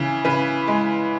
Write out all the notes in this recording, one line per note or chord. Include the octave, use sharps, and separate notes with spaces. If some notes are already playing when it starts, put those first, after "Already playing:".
Already playing: C#3 E3
C#3 B4
G#3